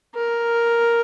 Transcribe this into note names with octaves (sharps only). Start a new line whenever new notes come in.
A#4